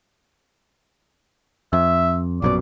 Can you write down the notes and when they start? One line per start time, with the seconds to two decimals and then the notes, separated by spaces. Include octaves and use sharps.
1.73 F2 E5
2.42 A#1 F#2 B2 D5